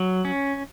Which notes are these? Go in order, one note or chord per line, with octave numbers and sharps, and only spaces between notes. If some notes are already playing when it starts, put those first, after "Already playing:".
Already playing: F#3
C#4